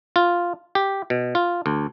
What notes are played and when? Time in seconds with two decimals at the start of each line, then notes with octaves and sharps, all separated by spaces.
0.16 F4
0.75 G4
1.10 B2
1.35 F4
1.66 D2